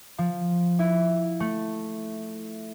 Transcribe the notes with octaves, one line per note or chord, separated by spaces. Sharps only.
F3
E4
A3